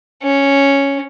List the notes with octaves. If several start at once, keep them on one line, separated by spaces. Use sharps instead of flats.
C#4